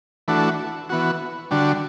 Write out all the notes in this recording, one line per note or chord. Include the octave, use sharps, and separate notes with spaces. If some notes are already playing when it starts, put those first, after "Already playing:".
E3 A3 D4 F#4
E3 B3 F#4
D3 G3 D4 F#4